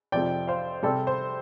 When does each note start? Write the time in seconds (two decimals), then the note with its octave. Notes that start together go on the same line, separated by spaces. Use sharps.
0.12 F2 C3 F3 C4 D5 G5
0.48 C5 F5
0.83 C3 G3 C4 A4 D5
1.07 C5